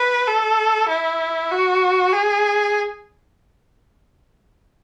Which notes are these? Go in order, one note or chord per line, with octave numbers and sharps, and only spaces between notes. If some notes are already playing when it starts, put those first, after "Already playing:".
Already playing: B4
A4
E4
F#4
G#4